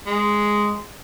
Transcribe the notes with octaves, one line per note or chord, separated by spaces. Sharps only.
G#3